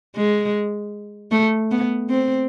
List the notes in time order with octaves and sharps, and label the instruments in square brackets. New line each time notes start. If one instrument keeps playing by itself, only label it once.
[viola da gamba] G#3
A3
B3
C4